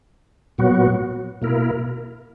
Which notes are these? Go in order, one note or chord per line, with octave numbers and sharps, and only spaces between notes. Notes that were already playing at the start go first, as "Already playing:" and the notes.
A#2 F#3 B3 F#4
B2 A#3 E4 A#4